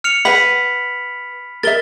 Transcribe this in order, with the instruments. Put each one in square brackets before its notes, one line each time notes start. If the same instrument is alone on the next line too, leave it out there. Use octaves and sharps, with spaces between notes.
[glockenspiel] F6 C#7 F7
[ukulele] B4 F#5 [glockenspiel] B5 B6 F#7
[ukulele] A#4 E5 [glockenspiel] A6 G7